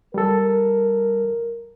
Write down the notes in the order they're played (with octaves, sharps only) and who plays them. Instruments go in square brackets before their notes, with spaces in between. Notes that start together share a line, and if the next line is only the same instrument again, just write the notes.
[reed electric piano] G3 A4 [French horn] A#4